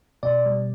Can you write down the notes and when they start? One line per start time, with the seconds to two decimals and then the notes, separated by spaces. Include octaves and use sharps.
0.23 B2 D5
0.46 G3